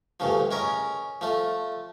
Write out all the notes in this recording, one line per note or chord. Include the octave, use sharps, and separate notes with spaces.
D2 G2 C#3 F3
G#3 C#4 A#4
F3 A3